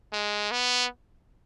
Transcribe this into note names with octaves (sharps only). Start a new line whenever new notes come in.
G#3
B3